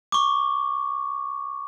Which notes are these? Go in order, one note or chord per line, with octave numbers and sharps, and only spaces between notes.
C#6 D6